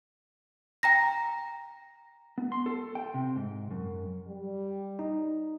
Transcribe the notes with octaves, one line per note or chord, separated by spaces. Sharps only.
G5 A#5 A#6
B3
C6
A4
G5
C3
G#2
F#2
G3
D#4